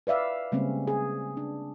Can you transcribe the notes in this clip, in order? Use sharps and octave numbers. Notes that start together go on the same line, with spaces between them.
B4 D5 E5 F5
C#3 G3 G#3 A#3 C4 C#4
G#4
D4